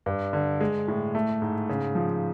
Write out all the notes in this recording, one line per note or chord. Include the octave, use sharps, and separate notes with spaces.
G2
D3
G#3
A2
A3
G#2
C#3
F3